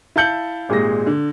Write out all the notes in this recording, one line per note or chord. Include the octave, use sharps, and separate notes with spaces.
E4 F5 A5 G6 C#7 F#7
G#1 A#2 G#3 G4 G#4 A#6
D3